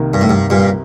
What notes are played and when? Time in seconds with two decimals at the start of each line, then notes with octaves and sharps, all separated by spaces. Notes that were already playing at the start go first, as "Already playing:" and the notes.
Already playing: C2 C3 D#3 A#3
0.14 G2
0.21 A2
0.30 G2
0.50 G2 A#2